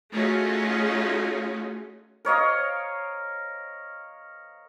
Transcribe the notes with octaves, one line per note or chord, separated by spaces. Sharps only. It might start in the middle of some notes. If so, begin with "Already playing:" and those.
A3 C#4 D#4 F4 F#4 G#4
A#4 C#5 D#5 F5